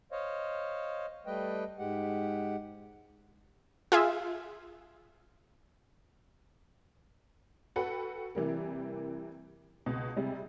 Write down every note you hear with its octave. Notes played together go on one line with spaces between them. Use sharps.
C5 C#5 D#5 F5
G3 A3 B4 D#5 G5
G#2 G#3 G4 F#5
F4 G#4 E5
F#4 A4 B4 F#5 G5 B5
C3 E3 G3 A#3
C#2 B2
C3 G3 G#3